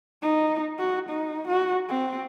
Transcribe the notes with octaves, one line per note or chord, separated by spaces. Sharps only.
D#4
F#4
D#4
F#4
C4